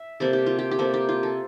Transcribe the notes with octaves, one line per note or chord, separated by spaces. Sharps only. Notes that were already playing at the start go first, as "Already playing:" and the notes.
Already playing: E5
C3 G3 A#3 A4
G4
F4
G4
G4
C3 G3 A#3 A4
G4
F4
A4